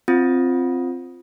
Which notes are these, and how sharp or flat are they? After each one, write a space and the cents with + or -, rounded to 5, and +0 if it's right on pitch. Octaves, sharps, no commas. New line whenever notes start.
C4 +0 F4 +0 D#6 +0